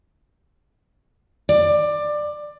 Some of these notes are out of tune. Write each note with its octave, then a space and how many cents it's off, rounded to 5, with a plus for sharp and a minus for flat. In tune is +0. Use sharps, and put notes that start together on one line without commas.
D5 +20